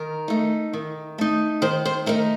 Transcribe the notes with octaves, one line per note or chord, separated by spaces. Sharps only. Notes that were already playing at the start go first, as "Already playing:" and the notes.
Already playing: D#3 A#4
A3 D#4
D#3
A3 D#4
D#3 C5
C5
A3 D#4 A#4